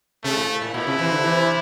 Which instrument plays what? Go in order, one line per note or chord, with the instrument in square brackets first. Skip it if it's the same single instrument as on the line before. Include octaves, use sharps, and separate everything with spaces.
[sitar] C3 [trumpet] A3
[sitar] A2
A2
[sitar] A#2 [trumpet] E4
[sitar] C3
C3 E3
D3
C3 E3